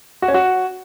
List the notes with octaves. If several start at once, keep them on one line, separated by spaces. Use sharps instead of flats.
F#4
C#4
F#4